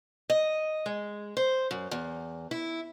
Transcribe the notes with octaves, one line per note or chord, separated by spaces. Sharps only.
D#5
G#3
C5
F#2
E2
E4